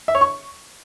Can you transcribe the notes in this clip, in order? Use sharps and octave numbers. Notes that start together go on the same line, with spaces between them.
E5
C#5
C#6